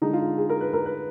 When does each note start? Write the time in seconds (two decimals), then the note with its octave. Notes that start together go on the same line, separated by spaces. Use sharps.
0.02 D3 G#3 D#4
0.13 F4
0.38 G#4
0.49 A#4
0.61 B4
0.73 A#4
0.86 B4